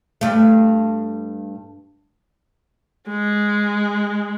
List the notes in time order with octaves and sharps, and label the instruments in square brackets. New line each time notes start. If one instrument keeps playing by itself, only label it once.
[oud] G2 A3
[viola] G#3